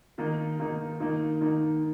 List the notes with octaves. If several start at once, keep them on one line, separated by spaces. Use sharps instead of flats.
D#3 A#3 D#4
D#3 A#3 D#4
D#3 A#3 D#4
D#3 A#3 D#4